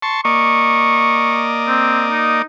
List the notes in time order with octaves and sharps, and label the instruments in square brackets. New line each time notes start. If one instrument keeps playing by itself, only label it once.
[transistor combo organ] A5 C6 C#6
[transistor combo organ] A#3 D5 D#5 [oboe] C#6
[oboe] C4
D#4